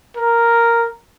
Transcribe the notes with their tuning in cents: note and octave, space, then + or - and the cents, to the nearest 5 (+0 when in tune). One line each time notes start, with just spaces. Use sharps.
A#4 +0